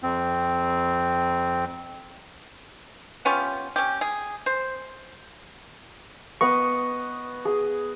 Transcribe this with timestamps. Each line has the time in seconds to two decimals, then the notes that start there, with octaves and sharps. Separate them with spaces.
0.03 F2 C4
3.25 B3 C#4 F4 G4
3.76 C#4 G4
4.01 G#4
4.46 C5
6.41 B3 D#5 C#6
7.45 G#4